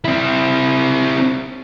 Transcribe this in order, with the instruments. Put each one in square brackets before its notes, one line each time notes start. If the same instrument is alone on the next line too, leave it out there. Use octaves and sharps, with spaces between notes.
[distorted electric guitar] C4 E4